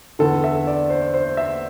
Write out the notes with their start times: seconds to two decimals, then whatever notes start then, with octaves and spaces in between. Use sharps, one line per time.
0.19 E2 D3 A4
0.44 E5
0.67 D5
0.90 C5
1.14 C5
1.37 E5